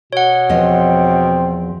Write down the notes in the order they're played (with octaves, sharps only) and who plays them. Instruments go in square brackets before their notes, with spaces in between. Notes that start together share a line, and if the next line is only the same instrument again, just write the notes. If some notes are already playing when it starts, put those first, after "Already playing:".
[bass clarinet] B2 [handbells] C#5 F#5
[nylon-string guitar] E2 F3 D#5 [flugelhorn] C4